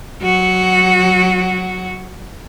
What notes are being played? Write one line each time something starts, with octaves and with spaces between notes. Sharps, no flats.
F#3 F#4